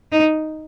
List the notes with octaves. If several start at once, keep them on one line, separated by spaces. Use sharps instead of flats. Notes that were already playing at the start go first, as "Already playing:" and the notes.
D#4